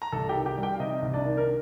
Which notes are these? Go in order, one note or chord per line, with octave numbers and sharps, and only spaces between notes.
A#5
C2 A4 A5
G4 G5
D#3
G4 G5
G3
G4 G5
F5
C3 D#4 D#5
C2
D4 D5
D#3
A#4